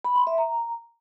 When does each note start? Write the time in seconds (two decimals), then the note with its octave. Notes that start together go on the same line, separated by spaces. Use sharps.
0.05 B5
0.16 C6
0.27 E5
0.38 A#5